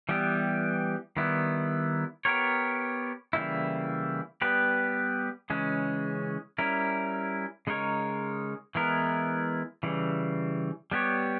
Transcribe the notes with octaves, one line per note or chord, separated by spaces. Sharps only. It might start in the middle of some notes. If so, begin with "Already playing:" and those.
E3 G3 B3 G4
D#3 G3 B3 E4
B3 G4 A#4 C#5
C#3 E3 G3 A#3 E4
G3 B3 G4 B4
C#3 E3 G#3 C#4
G3 C#4 E4 A#4
C#3 G#3 D#4 A#4 C#5
E3 G#3 B3 E4 A#4
C#3 E3 G3
G3 B3 G4 C#5